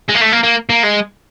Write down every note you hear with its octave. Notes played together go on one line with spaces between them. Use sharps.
G#3
A#3
A3
A#3
A#3
A#3
G#3